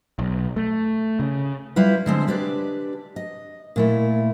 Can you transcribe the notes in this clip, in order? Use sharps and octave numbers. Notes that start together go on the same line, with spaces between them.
B1
A3
C#3
G3 E4 F4 B4
D3 G#3 C4
D4 G4 B4 D5
D#5
A#2 A3 E4